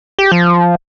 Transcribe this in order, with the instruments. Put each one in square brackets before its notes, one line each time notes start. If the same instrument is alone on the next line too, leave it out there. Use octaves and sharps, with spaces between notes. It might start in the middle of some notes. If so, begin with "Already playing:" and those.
[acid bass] G4
F3